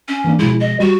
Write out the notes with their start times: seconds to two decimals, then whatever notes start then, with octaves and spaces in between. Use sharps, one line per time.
0.08 C#4
0.24 E3 A#3 D4
0.39 B2 F3 G#3 E4
0.60 D#5
0.80 G3 F#4